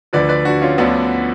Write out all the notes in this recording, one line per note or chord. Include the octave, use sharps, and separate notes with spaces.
D2 D3 F3 B4 D5
B4 D5
D4 F#4
C#4 F4
D2 D3 F3 B3 D4